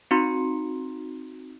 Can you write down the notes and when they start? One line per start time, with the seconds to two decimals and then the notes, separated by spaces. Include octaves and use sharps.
0.11 C4 D#4 F#4 A#5 C6 C#7